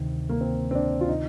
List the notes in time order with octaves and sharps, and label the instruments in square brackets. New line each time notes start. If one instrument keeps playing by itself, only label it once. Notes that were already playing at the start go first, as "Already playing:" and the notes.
Already playing: [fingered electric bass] D2 C3 D#3
[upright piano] A#3
C4
C4
D4
F4
D#4